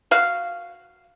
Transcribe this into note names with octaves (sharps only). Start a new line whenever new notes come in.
F#4 F5